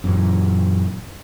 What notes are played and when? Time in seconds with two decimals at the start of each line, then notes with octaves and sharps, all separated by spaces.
0.04 F#2 A#2 E3